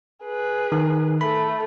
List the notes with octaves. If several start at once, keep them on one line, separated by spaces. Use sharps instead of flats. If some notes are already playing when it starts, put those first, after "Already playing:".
G#4 B4
D#3
A3 B5